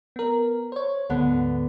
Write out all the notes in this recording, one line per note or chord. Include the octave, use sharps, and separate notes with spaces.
B3 A#4
C5 C#5
D2 G#2 D3 B3